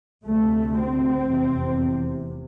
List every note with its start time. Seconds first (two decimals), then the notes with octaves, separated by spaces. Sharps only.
0.25 D2 C3 A3
0.78 C4
1.30 F1 E2 C3